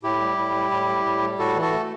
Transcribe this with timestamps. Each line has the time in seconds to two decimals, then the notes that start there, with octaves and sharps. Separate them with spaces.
0.03 A2 E4 G4
0.20 G3
0.37 A2
0.54 G3
0.71 A2
0.88 G3
1.05 A2
1.22 G3
1.39 A2 F#4 A4
1.56 E3
1.61 F#4 A4
1.73 A3